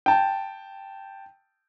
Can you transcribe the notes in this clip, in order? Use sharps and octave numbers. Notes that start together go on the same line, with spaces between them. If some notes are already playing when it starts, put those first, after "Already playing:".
G5 A5